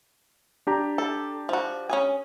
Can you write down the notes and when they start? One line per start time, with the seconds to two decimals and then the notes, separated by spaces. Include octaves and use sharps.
0.67 D4 G4 A#5
0.98 A4
1.49 F3 F#4
1.90 C#4 G#4 G#5